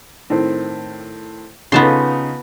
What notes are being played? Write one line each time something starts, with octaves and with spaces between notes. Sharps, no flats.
A2 D#3 C4
C#3 B3 D#4 F4 A5 C6